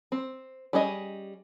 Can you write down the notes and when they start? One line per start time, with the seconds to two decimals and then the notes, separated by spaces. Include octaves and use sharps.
0.12 C4
0.73 G3 C#4 G#4 D#5